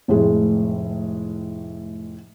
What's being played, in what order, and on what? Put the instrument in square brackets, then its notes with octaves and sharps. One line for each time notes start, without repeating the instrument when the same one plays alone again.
[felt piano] F1 A2 G#3